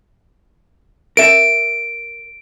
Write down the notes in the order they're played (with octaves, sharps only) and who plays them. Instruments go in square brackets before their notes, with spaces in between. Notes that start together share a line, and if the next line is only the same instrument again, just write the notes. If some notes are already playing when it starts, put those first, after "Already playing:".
[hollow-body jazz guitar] A#4 E5 [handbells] D7